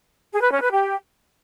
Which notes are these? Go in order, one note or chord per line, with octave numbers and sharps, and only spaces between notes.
G#4
B4
C#4
B4
G4